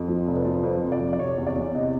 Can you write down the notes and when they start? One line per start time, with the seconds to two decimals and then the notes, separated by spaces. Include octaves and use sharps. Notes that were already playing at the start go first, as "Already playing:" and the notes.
Already playing: F2
0.08 F3
0.27 F1
0.36 B4
0.45 F3
0.63 F2 C5
0.83 F1
0.92 D5
1.00 F2
1.13 D5
1.19 C3 C#5
1.38 E2
1.47 D5
1.56 E2
1.75 C3 D#5